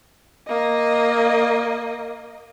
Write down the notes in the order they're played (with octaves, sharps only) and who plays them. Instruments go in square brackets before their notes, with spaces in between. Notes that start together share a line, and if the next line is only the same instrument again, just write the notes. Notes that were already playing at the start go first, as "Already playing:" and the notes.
[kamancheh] A#3 D#5